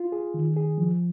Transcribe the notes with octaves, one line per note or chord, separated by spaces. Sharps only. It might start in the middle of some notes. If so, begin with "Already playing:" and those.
Already playing: F4
G#4
D#3
G#4
F3